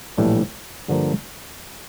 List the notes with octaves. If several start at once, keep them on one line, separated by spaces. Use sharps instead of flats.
A#1 A2 E3 G3 D4
G2 D3 F3 A#3